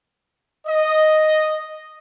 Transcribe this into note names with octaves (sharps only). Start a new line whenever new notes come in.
D#5